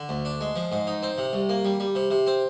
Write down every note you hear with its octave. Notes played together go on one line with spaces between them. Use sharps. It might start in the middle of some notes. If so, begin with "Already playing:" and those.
Already playing: D3
D2
D4
G#3
F3
G#2
D#4
C4
C3
C2
A#3
G3
G3
C3
C3
C4